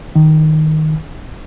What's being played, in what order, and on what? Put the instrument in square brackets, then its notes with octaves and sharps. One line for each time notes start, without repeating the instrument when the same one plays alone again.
[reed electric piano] D#3